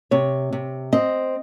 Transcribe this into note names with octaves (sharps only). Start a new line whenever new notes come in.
C3 C#5
C3
C4 D#5